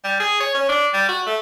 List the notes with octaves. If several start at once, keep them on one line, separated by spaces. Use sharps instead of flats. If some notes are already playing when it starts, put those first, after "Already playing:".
G3
G#4
C#5
C#4
D4
G3
F#4
A3